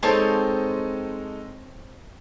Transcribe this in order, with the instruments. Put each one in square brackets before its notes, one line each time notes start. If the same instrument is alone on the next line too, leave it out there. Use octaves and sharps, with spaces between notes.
[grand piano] G#3 D#4 A4 [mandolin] C4 C#5 A5